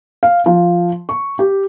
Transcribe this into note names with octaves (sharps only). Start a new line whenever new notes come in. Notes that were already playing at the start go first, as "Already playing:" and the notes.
F5
F3
C#6
G4